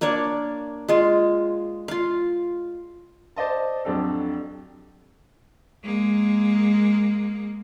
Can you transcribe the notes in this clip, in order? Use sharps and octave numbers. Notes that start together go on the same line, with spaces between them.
A#3 D4 C#5 D5
G#3 F4
F4 F5
C5 D5 D#5 A5
F2 F#3 D4 G4 A4
G#3 A#3